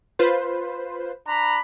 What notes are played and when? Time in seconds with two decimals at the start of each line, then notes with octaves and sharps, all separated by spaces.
0.19 F4 B4 C5
1.28 D4 A#5 B5